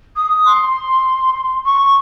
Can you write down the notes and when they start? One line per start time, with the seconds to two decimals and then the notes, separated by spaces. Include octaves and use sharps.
0.16 D#6
0.45 C6
1.65 C#6